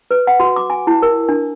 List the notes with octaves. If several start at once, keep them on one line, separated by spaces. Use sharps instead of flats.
B4
F#5
F#4
D6
G#5
E4
A#4
D4